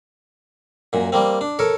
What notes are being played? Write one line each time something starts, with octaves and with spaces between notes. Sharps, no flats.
F#2 A#2
G3 A#3 C4
D4
A4 A#4 C#5